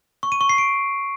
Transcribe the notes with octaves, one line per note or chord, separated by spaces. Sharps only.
C#6
D#7
C#6
C7
D7